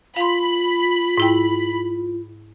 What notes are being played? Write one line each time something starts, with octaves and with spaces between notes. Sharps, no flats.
F4 F5 B5 C6
G#2 E4 G5